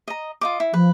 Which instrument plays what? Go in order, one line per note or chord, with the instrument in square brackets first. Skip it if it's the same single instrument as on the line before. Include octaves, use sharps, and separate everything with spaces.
[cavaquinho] D#5 A#5
F4 D#5 D6
E4
[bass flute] F3 [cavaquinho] B4